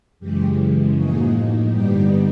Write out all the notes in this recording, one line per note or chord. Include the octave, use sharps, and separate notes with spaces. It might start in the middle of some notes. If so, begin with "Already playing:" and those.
F#2 C#3 E3 G#3 G4
A2 F3 A#3 D#4 F#4 G#4
G2 D3 G3 B3 D#4 G4